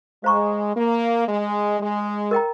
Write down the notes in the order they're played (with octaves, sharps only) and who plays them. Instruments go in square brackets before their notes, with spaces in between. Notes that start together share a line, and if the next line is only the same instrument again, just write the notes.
[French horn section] G#3 [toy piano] C5 F5 A#5 C#6
[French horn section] A#3
G#3
G#3
[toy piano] A#4 D#5 G5 A#5